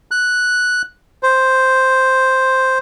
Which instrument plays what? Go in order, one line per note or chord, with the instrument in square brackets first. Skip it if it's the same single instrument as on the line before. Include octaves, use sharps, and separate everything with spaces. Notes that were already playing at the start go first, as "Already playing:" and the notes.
[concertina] F#6
C5